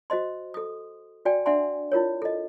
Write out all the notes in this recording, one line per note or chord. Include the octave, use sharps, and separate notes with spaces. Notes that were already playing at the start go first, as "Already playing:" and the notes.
F#4 C5 D#5 C6
A4 D#6
F#4 D5 G5 G#5
D4 D5 E5 F#5 G#5 C6
E4 F4 A#4 C#5
A4 D#5